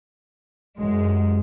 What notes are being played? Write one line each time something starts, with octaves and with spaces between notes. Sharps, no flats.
F#2 G#3